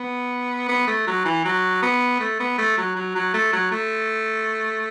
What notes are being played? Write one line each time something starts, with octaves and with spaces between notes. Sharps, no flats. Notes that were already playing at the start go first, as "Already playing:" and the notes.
Already playing: B3
B3
A3
F#3
E3
F#3
B3
A3
B3
A3
F#3
F#3
F#3
A3
F#3
A3